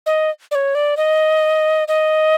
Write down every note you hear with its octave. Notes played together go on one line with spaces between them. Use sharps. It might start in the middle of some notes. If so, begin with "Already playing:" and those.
D#5
D5
C#5
D5
D#5
D#5